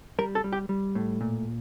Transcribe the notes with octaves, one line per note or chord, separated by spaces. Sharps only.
G3 A#4
A4
G3
G4
G3
A2
A#2